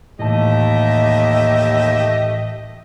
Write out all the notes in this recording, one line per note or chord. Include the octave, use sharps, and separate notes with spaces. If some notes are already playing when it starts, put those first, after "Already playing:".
D#2 A2 E3 A3 G4 D#5 E5 A5